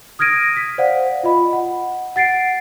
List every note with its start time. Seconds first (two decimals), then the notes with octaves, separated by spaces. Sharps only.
0.19 D#6 F6 G#6 A#6 D7 D#7
0.56 B6
0.78 C5 D5 F5 F#5
1.23 F4 D#5 B5
1.53 F#5
2.16 F#5 A6 C7 D7